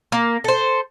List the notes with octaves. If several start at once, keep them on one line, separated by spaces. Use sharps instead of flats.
A#3
A4 C5